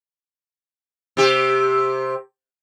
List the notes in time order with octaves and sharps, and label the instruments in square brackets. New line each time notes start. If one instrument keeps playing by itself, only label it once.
[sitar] C3 G4